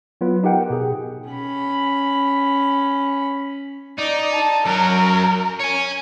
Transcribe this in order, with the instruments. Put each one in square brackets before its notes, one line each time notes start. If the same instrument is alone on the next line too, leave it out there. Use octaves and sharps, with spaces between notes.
[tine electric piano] F#3 B3 F4 B4
D#4 G4 A#4 F#5 G5
B2 G#4
[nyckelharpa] C#4 B5
[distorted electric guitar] D#4 [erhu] D5
[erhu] A5
[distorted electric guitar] F#2 F#3 [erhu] A#4
[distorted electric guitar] C#5 G#5